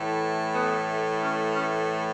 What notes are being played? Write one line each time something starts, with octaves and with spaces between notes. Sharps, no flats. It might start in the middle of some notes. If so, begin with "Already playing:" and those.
Already playing: A2 E3 A3
B3
C#4
C#4